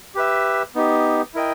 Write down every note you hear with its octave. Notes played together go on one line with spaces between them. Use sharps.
G4 B4 E5
B3 D#4 G4
E4 A#4 D#5 G5